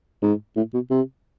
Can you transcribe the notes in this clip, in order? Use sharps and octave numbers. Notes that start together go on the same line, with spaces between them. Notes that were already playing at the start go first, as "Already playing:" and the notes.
G#2
A2
B2
C3